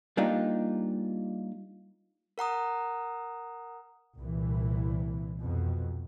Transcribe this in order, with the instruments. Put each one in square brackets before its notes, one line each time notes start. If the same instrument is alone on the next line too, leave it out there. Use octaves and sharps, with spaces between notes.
[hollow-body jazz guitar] G3 A#3 D4 D#4 F4 G4
[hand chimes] A#4 F#5 A#5 D#6
[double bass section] C2 A#2 E3
F2 B2